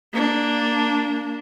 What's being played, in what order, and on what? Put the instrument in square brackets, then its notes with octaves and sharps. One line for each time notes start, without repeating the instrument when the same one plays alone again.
[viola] A#3 D4